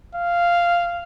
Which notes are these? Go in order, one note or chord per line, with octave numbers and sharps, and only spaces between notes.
F5